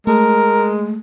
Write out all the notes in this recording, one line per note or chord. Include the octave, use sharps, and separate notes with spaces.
G#3 A3 A#4